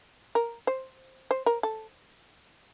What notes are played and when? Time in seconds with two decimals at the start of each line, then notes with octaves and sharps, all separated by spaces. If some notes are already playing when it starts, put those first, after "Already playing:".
0.35 A#4
0.67 C5
1.31 C5
1.46 A#4
1.63 A4